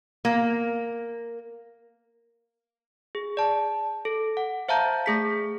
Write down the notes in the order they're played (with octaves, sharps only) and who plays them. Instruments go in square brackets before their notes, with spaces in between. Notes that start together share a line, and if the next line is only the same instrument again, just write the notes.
[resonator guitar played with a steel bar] A#3
[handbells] G#4
D5 A5
A4
F#5
C5 E5 F5 A5 A#5 G6
A3 G#4 B6